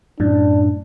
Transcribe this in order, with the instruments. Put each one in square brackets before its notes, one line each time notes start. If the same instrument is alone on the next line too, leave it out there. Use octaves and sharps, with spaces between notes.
[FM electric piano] F#2 A2 [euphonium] D4